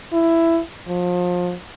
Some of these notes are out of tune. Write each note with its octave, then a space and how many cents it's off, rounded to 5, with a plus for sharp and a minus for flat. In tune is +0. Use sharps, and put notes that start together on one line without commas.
E4 +10
F3 +30